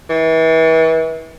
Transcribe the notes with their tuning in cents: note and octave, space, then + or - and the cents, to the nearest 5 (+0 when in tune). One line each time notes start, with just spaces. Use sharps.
E3 -35